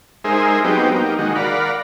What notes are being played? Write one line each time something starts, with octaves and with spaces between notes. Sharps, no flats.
G#3 D#4 G#4 A#4 C5 E5
F#3 B3 C4 D#4 G4
A#3 D#4 G4
D#3 G#3 F#4
A#4 D5 F5 F#5 B5